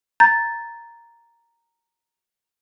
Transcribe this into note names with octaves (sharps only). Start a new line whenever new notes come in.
A#5 G6 A6